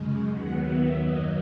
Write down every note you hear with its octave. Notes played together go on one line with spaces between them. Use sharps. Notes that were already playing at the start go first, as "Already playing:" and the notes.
Already playing: F#2 C#3 G#3
D#2 D#3 F#3 B3 F#5
E5
F#2 D#3 F#3 A#3 D#5